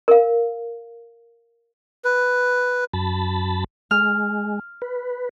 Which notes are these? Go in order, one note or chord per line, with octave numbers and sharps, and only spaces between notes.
A#4 F5
B4
F#2 A5 B5
G#3 F6
B4